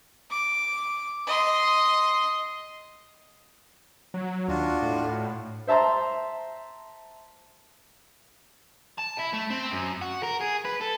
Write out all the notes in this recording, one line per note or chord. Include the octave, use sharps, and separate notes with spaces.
D6
D#5 C6
F#3
D#2 D4 F4 F#4
A2
C5 E5 A5 A#5 C6
A5
E4
A3
C4
F#2
F#4
A#4
G#4
B4
A4